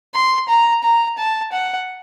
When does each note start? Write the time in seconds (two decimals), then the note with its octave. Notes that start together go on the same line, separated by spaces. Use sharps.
0.14 C6
0.49 A#5
0.83 A#5
1.18 A5
1.52 F#5